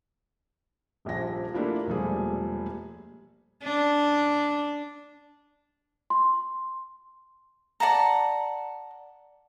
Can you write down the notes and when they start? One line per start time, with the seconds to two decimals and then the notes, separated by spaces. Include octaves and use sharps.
1.05 D#1 A#1 F3 A#6
1.54 A3 A#3 D4 E4 F4 G4
1.87 E1 A#2 F3 G3 A3 G#4
3.63 D4
6.10 C6
7.80 D5 F#5 A5 A#5